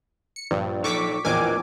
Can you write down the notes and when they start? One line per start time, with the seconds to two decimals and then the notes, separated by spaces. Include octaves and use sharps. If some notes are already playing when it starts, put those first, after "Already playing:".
0.36 C#7
0.51 A#1 G2
0.84 D#4 A4 C#6 D6 B6
1.25 A#1 E2 A2 A#4 C5 D#5 G#5 D6